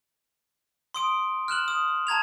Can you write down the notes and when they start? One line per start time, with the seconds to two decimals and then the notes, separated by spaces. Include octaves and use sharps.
0.94 C6 D#6 D7
1.48 F6 F#6 E7 F#7
1.68 D#6
2.07 A5 A#5 G#6 F7